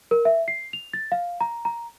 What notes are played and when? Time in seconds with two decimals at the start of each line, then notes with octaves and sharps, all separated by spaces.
0.11 A#4
0.25 E5
0.48 C7
0.73 F7
0.93 A6
1.12 F5
1.40 A#5
1.65 A#5